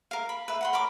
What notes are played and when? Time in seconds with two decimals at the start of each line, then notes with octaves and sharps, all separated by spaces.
0.11 A#4 F5
0.29 B5
0.48 B4 E5
0.61 F#5 B5 C6
0.73 A#4 C#5 B5 D6